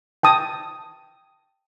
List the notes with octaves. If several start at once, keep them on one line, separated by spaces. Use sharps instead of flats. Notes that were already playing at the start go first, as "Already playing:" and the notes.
G5 A5 D#6